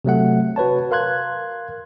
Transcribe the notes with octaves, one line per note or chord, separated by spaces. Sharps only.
C3 F#3 A3 F#5
F#4 B4 C#5 A5
A#4 F5 C6 F#6 G#6